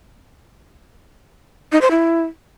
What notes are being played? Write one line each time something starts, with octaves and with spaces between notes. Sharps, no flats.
D#4
C5
E4